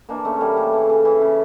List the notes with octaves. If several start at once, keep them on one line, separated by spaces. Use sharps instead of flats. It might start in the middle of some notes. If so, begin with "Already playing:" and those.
E3 A#3 D4
C#3 A3 C#4
E3 G3 A#3 C#4
C#3 A3
E3 A3
C#3
E3
C#3